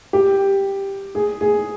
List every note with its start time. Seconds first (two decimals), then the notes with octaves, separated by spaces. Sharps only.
0.13 G4
1.15 G#4
1.41 G#4